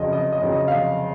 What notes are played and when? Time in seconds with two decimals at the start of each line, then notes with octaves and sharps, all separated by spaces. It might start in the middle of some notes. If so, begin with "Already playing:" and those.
Already playing: F1 F2 C#3 F#3 D#5
0.13 F1 D#5
0.33 D#5
0.42 F2 C#3 F#3
0.52 D#5
0.68 F5
0.72 F1 D#5